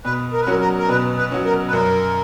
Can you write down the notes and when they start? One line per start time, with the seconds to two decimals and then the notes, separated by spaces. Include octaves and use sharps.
0.05 B2 B4
0.33 A#4
0.41 B4
0.47 F#3 C#4 F#4 A#4
0.60 A#4
0.78 A#4
0.89 B2 B4
1.17 B4
1.31 F#3 C#4 F#4
1.45 A#4
1.67 B4
1.73 F#2 A#4